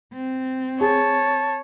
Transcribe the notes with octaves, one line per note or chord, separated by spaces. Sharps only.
C4
G#4 C#5 A5